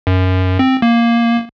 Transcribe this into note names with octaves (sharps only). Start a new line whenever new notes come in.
F#2
C4
A#3